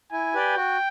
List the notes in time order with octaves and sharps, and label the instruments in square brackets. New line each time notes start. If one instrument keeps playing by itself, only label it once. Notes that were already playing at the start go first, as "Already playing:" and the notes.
[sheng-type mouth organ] E4 [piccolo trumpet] G#5
[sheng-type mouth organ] G4 B4 D5 G5
[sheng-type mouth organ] F#4 [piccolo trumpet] G5